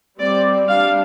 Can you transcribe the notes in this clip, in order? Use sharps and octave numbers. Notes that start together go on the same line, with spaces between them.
G3 C4 D5
G3 D4 F5